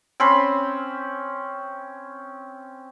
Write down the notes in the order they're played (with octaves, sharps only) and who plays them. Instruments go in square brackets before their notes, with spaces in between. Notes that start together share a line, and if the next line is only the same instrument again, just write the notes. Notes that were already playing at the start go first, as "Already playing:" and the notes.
[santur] C4 C#4 C5 B5